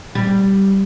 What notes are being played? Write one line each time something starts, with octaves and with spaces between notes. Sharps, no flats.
G3